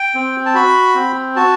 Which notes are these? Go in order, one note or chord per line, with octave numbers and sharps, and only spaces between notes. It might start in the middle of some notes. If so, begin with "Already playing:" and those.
Already playing: G5
C4
A5
F#4 B5
C4
F#4 A5